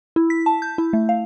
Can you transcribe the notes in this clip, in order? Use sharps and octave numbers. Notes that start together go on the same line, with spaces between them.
E4
B6
A5
G6
E4
A3
F5